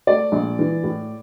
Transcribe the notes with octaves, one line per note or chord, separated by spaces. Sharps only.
A3 D5
A#1
E3
A2